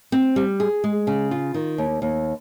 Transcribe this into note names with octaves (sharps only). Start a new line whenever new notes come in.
C4
G3
G#4
G#3
C#3
F4
D#3
D#2
D#2